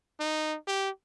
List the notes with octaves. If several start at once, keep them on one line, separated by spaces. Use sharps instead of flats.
D#4
G4